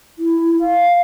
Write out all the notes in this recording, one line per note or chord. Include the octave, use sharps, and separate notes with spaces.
E4
F5